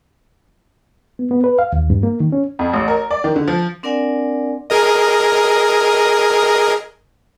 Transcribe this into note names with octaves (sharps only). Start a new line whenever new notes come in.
B3
B3
B4
F5
D#2
G2
A#3
D#3
C#4
F2
A1
A#4
D5
D#3
D3
F3
C4 D4 A#4 D5 F#5 G#5
G#4 A#4 D#5